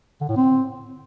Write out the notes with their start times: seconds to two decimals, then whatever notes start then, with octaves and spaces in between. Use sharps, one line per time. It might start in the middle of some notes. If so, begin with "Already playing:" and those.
0.21 D3
0.29 A2
0.37 C4